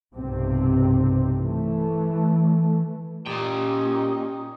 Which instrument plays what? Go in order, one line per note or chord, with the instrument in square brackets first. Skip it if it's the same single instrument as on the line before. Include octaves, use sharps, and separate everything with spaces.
[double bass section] B1 G2 C3 C4
E3 A3
[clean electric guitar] A#2 [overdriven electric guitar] C#4 G5 [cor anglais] D#4 [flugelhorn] G4